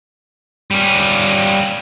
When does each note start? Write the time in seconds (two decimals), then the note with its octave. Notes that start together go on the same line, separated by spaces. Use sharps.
0.71 G3 C#4